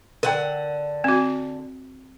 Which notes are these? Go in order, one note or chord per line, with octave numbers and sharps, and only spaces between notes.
D3 A#4 F#5 G5
C4 F#4